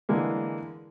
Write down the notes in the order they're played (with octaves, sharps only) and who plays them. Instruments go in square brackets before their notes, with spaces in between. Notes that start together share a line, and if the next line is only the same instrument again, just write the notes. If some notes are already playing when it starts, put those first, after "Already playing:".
[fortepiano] D3 E3 G#3 A#3